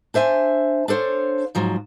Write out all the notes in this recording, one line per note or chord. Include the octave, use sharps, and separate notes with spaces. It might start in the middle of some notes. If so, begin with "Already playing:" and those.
D4 C5 E5 G#5
D4 A4 C5 C#5 F5
G#2 F3 F#3